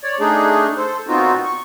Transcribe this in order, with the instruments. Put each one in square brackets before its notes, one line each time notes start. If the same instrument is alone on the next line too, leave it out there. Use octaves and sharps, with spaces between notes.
[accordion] C#5 D5
A3 D4 D#4 G#4
A4 C5
A#2 B3 C4 D#4 F4 F#4
C#6